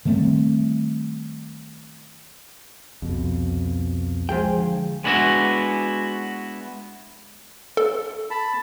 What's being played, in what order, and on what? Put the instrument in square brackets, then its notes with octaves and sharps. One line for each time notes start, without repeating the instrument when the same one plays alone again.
[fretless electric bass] D#3 G3 A3 C4
[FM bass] C2 [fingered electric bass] F2 B2
[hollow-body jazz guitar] F3 G#4 G5 [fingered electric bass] G#3
[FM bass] D3
[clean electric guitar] G#3 B3 D4 E4 F#4
[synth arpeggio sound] A4
[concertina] A5 B5